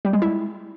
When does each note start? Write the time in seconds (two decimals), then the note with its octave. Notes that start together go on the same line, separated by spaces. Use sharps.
0.05 G3
0.13 G#3
0.22 E4